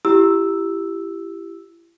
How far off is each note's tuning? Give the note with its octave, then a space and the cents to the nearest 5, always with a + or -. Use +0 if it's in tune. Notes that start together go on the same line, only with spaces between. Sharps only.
E4 +30 G4 +0 E6 +0